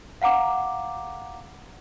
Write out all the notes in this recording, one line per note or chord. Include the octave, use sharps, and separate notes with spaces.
F5 F#5 A#5 D6